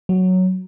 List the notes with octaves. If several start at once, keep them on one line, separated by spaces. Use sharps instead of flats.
F#3